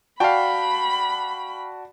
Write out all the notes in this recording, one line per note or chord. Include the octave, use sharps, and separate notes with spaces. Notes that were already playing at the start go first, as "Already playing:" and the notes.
F#4 D5 F5 G5 A5 B5